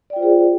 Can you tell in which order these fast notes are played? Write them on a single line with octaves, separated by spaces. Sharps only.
D5 G5 F4 C5 G#4